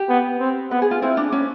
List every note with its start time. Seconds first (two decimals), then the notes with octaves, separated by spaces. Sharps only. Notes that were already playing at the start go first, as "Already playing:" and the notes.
Already playing: G4
0.09 B3
0.40 C4
0.71 B3 B4
0.82 G#4
0.91 F4
1.02 C4 E4
1.17 D4
1.32 C#4